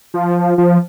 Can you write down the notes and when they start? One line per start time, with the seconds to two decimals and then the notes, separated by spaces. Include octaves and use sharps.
0.14 F3
0.58 F3